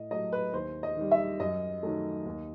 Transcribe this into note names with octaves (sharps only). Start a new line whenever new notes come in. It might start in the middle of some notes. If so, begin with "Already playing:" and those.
Already playing: A2 D#5
F#3 A3 D#5
B4
D#2 C5
D#5
D#3 G3
E5
F#2 D#5
D#3 F#3 A3
D#2